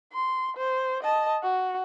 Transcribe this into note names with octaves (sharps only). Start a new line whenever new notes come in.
C6
C5
D#5 A5
F#4